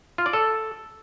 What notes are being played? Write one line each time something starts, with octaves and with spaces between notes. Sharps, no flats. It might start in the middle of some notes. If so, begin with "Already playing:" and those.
F4
D5
A4